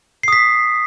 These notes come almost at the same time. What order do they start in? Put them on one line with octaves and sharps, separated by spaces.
C7 D#6 B6